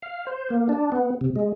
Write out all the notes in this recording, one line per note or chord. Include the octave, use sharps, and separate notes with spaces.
F5
C5
A#3
D4
B3
C3
G#3